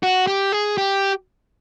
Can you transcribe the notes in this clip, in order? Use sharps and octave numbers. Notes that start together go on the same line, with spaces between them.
F#4
G4
G#4
G4